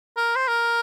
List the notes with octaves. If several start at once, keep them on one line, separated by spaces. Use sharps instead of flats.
A#4
C5
A#4